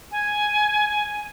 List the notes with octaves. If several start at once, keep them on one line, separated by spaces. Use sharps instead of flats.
G#5